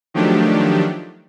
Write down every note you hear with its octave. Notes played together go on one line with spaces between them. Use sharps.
D#3 F3 F#3 A3 D4 G4